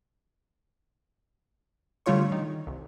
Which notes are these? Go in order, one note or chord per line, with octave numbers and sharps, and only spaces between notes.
D3 G3 A3 F4 C#5 C#6
D#3
C2